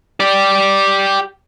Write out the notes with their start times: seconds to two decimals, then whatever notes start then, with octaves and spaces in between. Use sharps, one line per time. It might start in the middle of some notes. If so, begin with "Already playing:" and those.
0.20 G4 D5